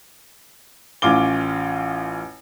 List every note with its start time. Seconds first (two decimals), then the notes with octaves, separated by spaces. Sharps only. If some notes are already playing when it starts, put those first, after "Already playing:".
1.02 A1 C#4 F4 D6 G7